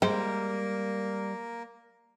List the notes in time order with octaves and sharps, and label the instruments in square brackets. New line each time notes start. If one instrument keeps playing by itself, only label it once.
[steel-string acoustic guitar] G3 [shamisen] G#3 C5 [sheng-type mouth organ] A#3 A#4